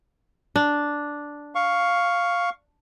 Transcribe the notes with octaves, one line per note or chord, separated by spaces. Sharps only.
D4
F5 C#6